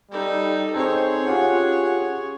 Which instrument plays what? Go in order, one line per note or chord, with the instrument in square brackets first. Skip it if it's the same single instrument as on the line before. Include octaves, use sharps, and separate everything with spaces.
[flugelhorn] G3 [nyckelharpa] D#4 A4
[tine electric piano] C4 D#4 A4 [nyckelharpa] G#4 C#5 [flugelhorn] C5
[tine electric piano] C#4 F4 G4 [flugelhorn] F#5